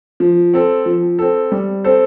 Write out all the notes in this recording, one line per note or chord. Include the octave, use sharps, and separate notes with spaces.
F3
C4 A4
F3
C4 A4
G3
C4 A4 C5